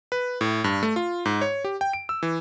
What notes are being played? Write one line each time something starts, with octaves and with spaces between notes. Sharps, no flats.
B4
A2
G2
A3
F4
G#2
C#5
G4
G5
D7
E6
E3